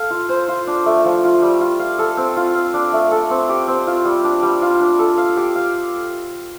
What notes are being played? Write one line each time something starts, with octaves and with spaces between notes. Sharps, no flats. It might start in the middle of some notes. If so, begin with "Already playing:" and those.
Already playing: A4 F5
F4
C5
F4
D4
A3
F3
F4
G3
F4
F5
A4
C4
F4
F5
D4
A3
A4
C4
G4
C4
F4
G3
D4
G3
F4
D4
A4
F5
G4
F5